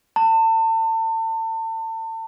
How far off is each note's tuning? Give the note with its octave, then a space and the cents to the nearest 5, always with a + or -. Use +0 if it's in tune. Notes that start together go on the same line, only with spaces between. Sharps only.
A5 +35